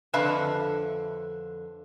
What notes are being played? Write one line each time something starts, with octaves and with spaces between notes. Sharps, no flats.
F2 D3 B4 E5 F5 A5